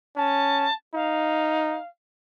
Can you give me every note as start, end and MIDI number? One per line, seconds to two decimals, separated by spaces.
0.16 0.67 61
0.16 0.73 81
0.94 1.79 63
0.94 1.86 77